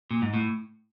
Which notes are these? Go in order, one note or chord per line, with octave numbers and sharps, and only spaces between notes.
A#2
G#2
A2